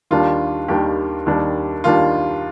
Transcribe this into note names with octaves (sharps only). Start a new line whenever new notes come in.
D#2 D#3 G3 D4 F4
D#2 D#3 G3 D4 G4
D#2 D#3 G3 D4
D#2 D#3 G3 D4 F4